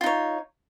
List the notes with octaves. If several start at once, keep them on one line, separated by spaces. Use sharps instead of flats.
D#4 F4 C#5